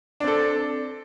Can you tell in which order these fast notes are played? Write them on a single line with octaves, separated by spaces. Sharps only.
D4 C4 A4